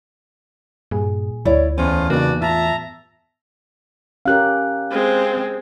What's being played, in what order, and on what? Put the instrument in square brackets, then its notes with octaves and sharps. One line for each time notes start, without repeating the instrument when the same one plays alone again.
[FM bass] G2 [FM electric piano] A#2 G#4
[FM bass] D2 [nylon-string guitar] E4 C#5 D5
[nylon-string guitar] E2 [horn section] A2 C#4 F4 [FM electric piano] C5
[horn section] G2 F#4 D5 [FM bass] C#3 [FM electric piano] A#3 B3 D#4
[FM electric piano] A2 [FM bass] F4 [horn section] E5 A5 A#5
[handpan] C#4 G4 A#4 [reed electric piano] F5 F#6
[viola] G#3 C4